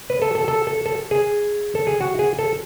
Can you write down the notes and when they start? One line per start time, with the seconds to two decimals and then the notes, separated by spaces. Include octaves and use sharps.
0.10 B4
0.22 A4
0.35 A4
0.48 A4
0.67 A4
0.86 A4
1.11 G#4
1.75 A4
1.87 G#4
2.01 F#4
2.19 G#4
2.39 A4